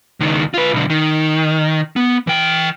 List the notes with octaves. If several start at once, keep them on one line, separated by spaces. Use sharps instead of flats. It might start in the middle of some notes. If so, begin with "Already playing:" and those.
C#2 D#3
F4 B4
B1 D3
D#3
B3
E3 G5